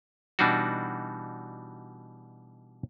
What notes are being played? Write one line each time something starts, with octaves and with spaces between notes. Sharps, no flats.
B2 E3 G3 D4 D#4 F#4